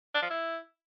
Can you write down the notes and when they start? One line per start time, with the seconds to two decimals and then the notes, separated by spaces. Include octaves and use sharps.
0.14 D4
0.22 F3
0.30 E4